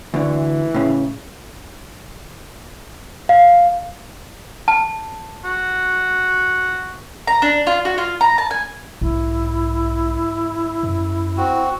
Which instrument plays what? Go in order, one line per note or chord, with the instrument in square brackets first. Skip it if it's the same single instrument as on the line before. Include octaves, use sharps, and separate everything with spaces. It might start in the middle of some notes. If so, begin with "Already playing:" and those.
[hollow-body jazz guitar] D2 D3 [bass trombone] E3
[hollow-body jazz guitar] A2 C#3
[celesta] F5
[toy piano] A5
[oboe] F#4
[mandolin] A#5
D4
F4
F#4
F4
A#5
A5
G#5
[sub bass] B1 [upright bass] G#2 [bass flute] E4
[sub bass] F#2
[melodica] C4 F#4